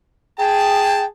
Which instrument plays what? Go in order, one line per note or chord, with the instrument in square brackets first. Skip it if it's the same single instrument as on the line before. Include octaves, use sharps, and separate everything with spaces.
[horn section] G#4 A5 [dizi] G5